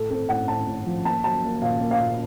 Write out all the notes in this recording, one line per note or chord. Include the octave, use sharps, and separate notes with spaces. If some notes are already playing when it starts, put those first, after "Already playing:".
Already playing: A2 A4
C4 A4
A2 F#5
A2 A5
A2
F3
A#3 A5
F#3 A5
A#3
A#2 F5
A#3
F5
A#2